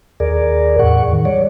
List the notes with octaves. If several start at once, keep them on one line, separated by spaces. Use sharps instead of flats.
D#2 G#4 A#4 D5
E2 A2 F#5 C#6
D#3
G3 C#5 D5